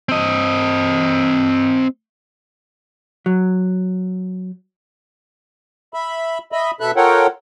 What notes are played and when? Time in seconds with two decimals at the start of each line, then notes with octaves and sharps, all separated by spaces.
0.09 C4 D#5
3.26 F#3
5.94 E5 B5
6.52 D#5 E5 B5
6.80 B2 A4 E5 B5 F#6
6.96 F4 A4 A#4 C#5 F#5 G5